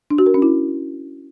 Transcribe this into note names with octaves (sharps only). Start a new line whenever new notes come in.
D4
F#4
A#4
C#4
E4